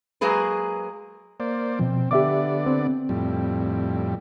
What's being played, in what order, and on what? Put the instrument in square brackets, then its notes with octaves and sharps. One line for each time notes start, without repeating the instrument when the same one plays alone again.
[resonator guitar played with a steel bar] F#3 G#3 A#3 G#4 B4
[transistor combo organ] A#3 C5 D5
[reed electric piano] B2 F3 [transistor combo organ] C4
[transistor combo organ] D3 B3 D5 [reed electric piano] G4 E5 D6
[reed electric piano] C4
[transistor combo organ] F2 A2 G3